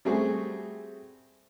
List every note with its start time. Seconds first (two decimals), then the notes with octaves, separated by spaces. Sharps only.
0.05 G3 A3 C4 F#4 G#4 C5